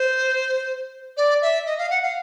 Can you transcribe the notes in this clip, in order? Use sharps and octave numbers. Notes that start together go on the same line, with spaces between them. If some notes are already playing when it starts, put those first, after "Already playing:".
Already playing: C5
D5
E5
D#5
F5
F#5
F5